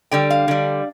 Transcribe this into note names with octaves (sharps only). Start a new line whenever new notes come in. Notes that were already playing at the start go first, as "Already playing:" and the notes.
D3 G3 G5
F5
D3 G3